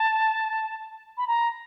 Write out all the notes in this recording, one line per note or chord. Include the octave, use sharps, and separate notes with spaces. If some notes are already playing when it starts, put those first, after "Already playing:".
Already playing: A5
B5
A#5